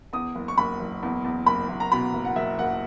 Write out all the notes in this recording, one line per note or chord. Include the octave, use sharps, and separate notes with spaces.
E2 D#6
F#1
C#6
F#1 B5
F#1
E2
E2
F#1 B5
F#1
A#5
B2 B5
F#1
F#5
F#1 E5
F#1 F#5